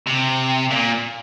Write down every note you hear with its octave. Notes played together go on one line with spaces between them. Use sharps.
C3
A#2